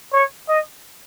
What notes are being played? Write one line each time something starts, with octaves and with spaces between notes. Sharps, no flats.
C#5
D#5